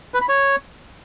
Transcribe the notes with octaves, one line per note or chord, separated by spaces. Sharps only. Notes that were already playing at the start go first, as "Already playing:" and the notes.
B4
B5
C#5